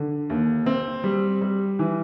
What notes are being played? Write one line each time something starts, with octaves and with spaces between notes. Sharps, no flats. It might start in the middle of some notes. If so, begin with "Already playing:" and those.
Already playing: D3
D#2
C4
G3
G3
E3